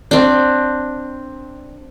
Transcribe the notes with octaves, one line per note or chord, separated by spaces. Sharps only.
C4 D4